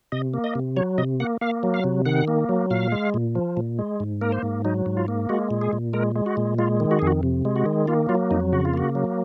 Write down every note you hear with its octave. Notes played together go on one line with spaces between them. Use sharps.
C3 D#5
A#3
D#5
C3
F#3 C#5
C3 D#5
A#3 F#5
A#3 F5
F#3
F5
C3
D#3 F#5
A#3
F#3
A#2 F5
G#3
A#2
F3
A#2
G#3
G#2
A#3 A#4
C5
G#2
F#3 D#4
G#2
F4
A#3
G#3 F#4
A#2
G#4
A#2
G#3 A#4
G#3
F#4
A#2
G#3 F4
D#3
F#4
F2 G#4
F#4
C3
G#3
F#4
D#3
A#3 F4
F#3 F4
F2 D#4
C#3 F#4
F4
A#3 F#4
F#3